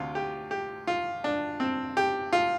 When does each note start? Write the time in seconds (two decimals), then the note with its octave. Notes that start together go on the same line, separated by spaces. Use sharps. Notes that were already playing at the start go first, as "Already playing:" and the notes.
Already playing: D2 C3 F4
0.15 G4
0.51 G4
0.87 F4
1.24 D4
1.60 C4
1.97 G4
2.33 F4